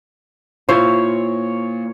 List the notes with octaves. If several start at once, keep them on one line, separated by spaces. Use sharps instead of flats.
A#2 E4 F4 C5 C#5